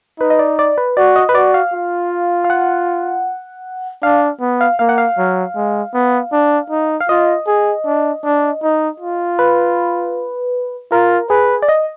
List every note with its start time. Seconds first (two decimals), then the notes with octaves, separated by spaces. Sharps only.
0.20 D#4 B4
0.30 D#5
0.39 D5
0.59 D5
0.78 B4
0.97 F#4 D5
1.16 D#5
1.29 B4
1.35 F#4 D5
1.54 F5
1.73 F4
2.44 F5
2.50 F#5
4.03 D4 F5
4.41 B3
4.61 F5
4.79 A#3 F5
4.89 F#5
4.98 F5
5.18 F#3
5.56 G#3
5.94 B3
6.32 D4
6.70 D#4
7.01 F5
7.09 F4 D#5
7.47 G#4
7.85 D4
8.24 D4
8.62 D#4
9.00 F4
9.39 B4
10.92 F4 A#4
11.30 G#4 B4
11.62 D5
11.69 D#5